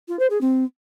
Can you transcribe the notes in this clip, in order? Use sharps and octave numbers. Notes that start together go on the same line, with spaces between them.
F4
C5
G#4
C4